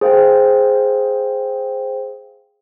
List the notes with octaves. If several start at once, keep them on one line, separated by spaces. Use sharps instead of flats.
G#4 C5 F5 G5